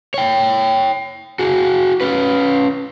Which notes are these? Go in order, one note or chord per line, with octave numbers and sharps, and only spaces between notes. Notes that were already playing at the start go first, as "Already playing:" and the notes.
C#5 G5
F#4 G#4
C#4 B4